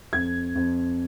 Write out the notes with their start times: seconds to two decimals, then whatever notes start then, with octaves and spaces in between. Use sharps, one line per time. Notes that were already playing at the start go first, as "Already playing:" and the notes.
0.13 F2 G#6
0.55 F2